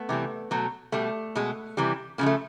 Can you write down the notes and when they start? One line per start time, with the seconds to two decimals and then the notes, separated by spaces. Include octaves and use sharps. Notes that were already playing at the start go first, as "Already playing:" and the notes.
Already playing: A3 B3
0.09 C3 E3 G3
0.51 B2 F#3 A3
0.92 B2 G3 A3
1.35 B2 G#3
1.77 C3 E3 G3
2.18 C#3 F3 G#3 A#3
2.26 A3